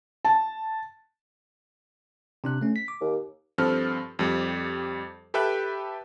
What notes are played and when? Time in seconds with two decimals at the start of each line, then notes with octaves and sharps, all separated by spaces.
0.25 A5
2.44 C3 D4 F#6
2.61 A3 C#4
2.76 B6
2.88 D6
3.01 D#2
3.58 G2 F3 C4 A4 F6
4.19 F2 G3
5.34 G4 A4 B4 E5 G5 F#6